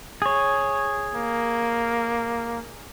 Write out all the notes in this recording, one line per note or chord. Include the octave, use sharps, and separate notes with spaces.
G#4 C#5
A#3